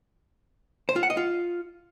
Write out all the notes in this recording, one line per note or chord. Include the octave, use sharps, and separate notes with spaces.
C5
F4
F#5
D#5
F4